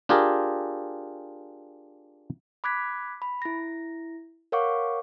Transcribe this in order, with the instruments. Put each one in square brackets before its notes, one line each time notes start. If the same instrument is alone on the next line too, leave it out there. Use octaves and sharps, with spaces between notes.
[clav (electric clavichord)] D4 F4 G4 G#4 A#4
[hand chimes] B5 D6 F#6 G#6 B6
B5
E4 A#6
A#4 C#5 F5 F#5 C#6 D6